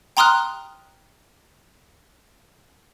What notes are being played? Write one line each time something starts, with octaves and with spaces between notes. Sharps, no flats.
G5 A#5 C6 D#6 F6 F#6